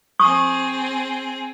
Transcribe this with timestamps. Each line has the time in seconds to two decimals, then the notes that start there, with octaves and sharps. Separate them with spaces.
0.19 C4 G#4 C#6 D#6